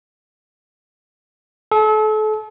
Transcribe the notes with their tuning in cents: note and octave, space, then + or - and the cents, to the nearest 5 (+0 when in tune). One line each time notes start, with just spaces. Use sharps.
A4 -35